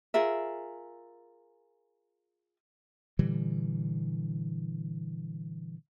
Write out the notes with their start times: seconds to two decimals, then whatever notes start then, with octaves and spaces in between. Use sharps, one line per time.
0.14 F4 G#4 A#4 E5
3.19 A#2 D3 E3 G3